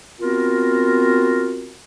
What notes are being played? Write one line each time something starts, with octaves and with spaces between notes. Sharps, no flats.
B3 C4 F4 F#4 A#4